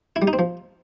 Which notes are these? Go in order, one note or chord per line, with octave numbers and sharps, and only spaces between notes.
E4
G3
D#4
C4
F3